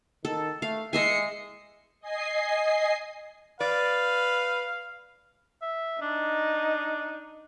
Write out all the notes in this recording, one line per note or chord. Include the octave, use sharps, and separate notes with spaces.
D#3 A4
A3 F5
G#3 D#5 E5 G#5 C7 C#7
D#5 G#5 C7
B4 D5 F5
E5
D4 D#4